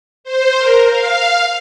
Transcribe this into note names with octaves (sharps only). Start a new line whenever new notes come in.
C5
A#4
F5